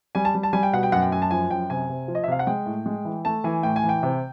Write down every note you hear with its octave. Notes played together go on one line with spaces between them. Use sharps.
G3 G#5
A5
G3
A5
G3 G#5
G5
B2 F#5
G5
F#2 F#5
G5
F#2 G#5
A5
F3 G#5
F#2 G5
C3 G#5
C3
F3
D#5
E5
C3 F5
F#5
G#3 G5
A2
G#3
E3
A3 A5
E3 G#5
A2 G5
G#5
E3
G5
C3